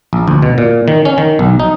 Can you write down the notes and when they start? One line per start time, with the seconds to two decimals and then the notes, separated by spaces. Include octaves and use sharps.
0.13 A#1
0.28 D2
0.43 B2
0.58 A#2
0.88 D#3
1.05 C#4
1.18 D#3
1.39 B1
1.60 D#4